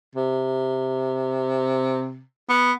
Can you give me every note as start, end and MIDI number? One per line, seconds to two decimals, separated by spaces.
0.15 2.23 48
2.50 2.72 59